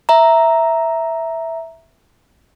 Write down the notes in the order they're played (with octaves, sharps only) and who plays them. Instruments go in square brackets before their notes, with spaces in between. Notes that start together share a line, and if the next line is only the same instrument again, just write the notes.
[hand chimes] E5 A#5